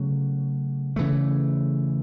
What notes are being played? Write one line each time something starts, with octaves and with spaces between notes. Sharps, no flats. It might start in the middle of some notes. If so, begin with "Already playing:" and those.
Already playing: C#3 F#3 A3
C#3 E3 A3